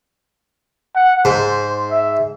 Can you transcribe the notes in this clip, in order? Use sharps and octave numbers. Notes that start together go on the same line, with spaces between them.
F#5
G#2 C5
E5